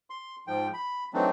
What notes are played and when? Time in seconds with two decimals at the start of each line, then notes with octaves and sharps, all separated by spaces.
0.10 C6
0.47 G#2 F3 G5
0.74 B5
1.13 E3 F#3 A3 C4 D4 D#4